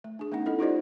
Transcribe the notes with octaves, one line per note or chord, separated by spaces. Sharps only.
A3
D4 G#4
A3 B3 C#4 D#4 F#5
E4 A4 D#5
D#4 F4 G4 C5 D5 D#5